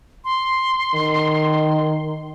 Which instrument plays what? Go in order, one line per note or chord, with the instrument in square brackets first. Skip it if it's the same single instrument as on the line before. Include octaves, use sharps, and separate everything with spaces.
[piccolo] C6
[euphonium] D#3